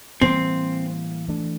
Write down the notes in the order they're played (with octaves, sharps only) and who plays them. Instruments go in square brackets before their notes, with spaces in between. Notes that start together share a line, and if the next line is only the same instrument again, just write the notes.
[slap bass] A2 E3 G3 A#3 [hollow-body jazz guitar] C4
[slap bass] E3 A3 D4